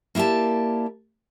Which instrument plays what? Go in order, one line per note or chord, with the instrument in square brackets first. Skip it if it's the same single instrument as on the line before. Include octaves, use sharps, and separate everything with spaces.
[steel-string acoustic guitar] A#3 E4 G4 D5 A5